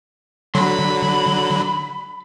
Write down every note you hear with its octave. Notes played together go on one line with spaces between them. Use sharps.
D3 F#3 B5 C6